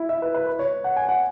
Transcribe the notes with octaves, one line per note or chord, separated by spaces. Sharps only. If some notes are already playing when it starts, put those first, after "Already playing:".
Already playing: E4
E5
B4
B4
B4
C#5
F#5
G#5
F#5